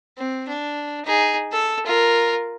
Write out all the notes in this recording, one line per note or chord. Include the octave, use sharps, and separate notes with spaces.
C4
D4
D#4 G#4
A4 E6
F4 A#4